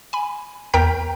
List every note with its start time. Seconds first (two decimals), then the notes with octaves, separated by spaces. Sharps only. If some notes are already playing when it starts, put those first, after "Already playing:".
0.13 G#5 B5
0.74 E2 A#4 G5 A#5 G6 B6